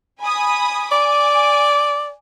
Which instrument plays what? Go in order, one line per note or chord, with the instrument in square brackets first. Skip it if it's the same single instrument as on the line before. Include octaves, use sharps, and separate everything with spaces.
[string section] G#5 B5 D#6
[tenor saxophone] D5 [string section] G#5 D6